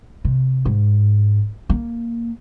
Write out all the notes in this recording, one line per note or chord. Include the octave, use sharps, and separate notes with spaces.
C3
G#2
A#3